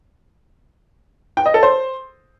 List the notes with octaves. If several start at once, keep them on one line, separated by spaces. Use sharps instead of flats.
G5
D#5
A4
C5